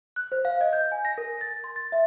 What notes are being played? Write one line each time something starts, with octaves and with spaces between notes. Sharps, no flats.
F#6
C5
F5
D#5
G6
G#5
A#6
A#4
A6
C6
A6
E5